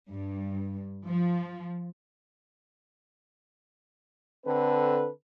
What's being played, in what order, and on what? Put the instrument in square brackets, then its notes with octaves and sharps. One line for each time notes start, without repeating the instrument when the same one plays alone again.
[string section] G2
F3
[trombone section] D3 C4 A4 B4